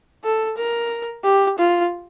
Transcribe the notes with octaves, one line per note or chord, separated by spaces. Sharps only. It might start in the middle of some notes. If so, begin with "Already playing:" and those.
A4
A#4
G4
F4